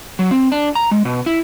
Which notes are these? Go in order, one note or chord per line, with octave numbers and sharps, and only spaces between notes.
F#3
C4
D4
A#5
G#3
B2
E4